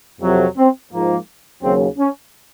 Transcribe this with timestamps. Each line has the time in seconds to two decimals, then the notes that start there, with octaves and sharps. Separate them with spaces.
0.21 F2 C3 F#3
0.57 C4
0.92 G#2 F3 A#3
1.62 D#2 C#3 F#3 C4
1.98 C#4